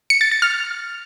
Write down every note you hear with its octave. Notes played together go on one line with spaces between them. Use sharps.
C#7
A6
A6
F6